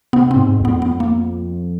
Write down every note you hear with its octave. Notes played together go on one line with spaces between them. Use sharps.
C3 B3
C4
G#2
F2
B3
B3
A#3